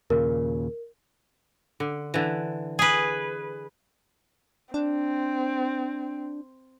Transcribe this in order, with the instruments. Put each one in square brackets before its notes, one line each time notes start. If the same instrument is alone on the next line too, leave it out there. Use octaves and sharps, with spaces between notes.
[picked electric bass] D#2 A#2 C#3 [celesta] A#4
[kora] D3
D3 E3
[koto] G#4 B4
[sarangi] C4 [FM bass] D4